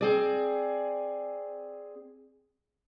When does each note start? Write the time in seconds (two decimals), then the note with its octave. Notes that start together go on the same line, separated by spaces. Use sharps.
0.01 C4 G#4 D5